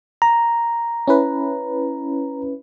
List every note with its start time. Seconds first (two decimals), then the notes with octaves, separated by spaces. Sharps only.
0.22 A#5
1.07 C#4 E4 B4